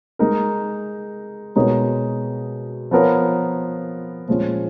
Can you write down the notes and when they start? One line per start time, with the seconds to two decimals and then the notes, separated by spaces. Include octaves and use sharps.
0.19 G#3 D#4 A#4
1.56 B2 G#3 D#4 A#4 C#5
2.91 F3 B3 F4 A#4 C#5
4.28 A#2 F3 G#3 C#4 F4